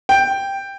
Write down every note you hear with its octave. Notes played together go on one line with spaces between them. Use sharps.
G5